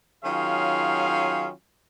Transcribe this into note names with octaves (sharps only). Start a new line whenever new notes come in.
D#3 F#3 C#4 F4 G#4 F5